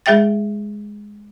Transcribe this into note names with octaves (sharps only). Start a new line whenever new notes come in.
G#3 G#4 E5 G5 A6